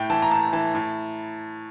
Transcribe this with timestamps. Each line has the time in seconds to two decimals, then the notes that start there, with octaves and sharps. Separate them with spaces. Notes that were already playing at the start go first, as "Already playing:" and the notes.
Already playing: A2 G5
0.10 E3 A5
0.22 A#5
0.31 A2 A5
0.53 E3 A5
0.75 A2